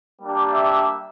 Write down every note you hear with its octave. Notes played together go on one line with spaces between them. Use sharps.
G3 A#3 D4 G4
E5